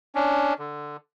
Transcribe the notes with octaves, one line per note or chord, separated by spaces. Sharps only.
C#4 D4
D3